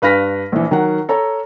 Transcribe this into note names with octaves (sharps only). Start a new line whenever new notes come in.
G2 B4 F5 F6 A#6 B6
A#1 E3
D#3 F#3 A#4 F#5
A4 C#5 A#5